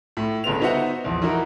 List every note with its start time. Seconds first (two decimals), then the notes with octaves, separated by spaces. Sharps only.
0.17 A2
0.44 G1 C#3 B3 F7
0.61 B3 D#4 F#4 C5 E5 F#5
1.04 A#1 E2
1.22 E3 D#4 F#4 A#4